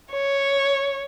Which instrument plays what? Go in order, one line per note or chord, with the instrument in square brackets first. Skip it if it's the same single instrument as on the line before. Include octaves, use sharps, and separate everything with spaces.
[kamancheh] C#5